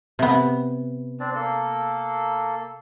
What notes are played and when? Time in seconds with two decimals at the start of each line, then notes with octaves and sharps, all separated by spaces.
0.19 C3 B3
1.20 C4 D4 D5
1.35 A#3 A4